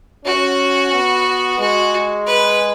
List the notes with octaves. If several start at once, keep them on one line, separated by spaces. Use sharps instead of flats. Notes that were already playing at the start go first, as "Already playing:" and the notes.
C#4 F#4
B3
G#3 F#4
B4